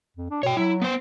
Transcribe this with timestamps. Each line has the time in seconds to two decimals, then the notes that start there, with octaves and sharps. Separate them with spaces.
0.17 F2
0.30 D4
0.43 B2 C#5 G5
0.57 F#3 E4
0.82 B3 C5